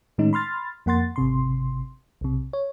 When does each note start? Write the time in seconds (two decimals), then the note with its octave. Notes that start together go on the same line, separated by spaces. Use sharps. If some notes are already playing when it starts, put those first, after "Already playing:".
0.18 A2 D#3 G#3 C#4 D#4
0.33 B5 C6 F6 A6
0.86 F2 A#3 F#5 C6 A6
1.16 G#1 C3 C6
2.21 B1 C3
2.53 C#5